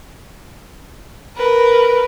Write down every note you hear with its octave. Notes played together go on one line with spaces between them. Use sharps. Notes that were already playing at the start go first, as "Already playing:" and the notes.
A#4 B4